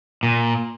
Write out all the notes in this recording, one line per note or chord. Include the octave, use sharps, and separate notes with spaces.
A#2